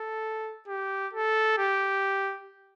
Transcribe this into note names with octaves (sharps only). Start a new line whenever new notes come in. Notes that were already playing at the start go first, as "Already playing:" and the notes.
Already playing: A4
G4
A4
G4